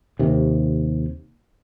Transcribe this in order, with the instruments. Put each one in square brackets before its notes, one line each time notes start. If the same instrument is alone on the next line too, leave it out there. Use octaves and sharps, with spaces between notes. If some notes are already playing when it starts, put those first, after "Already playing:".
[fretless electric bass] D#2 C3